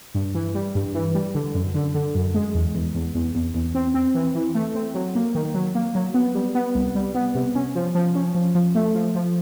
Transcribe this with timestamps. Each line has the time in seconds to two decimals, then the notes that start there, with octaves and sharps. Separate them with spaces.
0.15 G2
0.35 E3
0.55 G3
0.75 G2
0.94 E3
1.15 G3
1.35 D3
1.55 F#2
1.75 D3
1.95 D3
2.15 F#2
2.34 G#3
2.55 E2
2.75 E2
2.95 E2
3.15 E2
3.35 E2
3.54 E2
3.75 C4
3.94 C4
4.14 E3
4.35 E3
4.55 A3
4.75 C4
4.95 F#3
5.15 A#3
5.35 D#3
5.55 F#3
5.75 A#3
5.95 F#3
6.14 B3
6.35 G3
6.55 B3
6.75 C2
6.95 G3
7.15 B3
7.35 C3
7.55 C#4
7.75 F3
7.95 F3
8.15 C#4
8.35 F3
8.55 F3
8.75 A3
8.95 F3
9.15 F3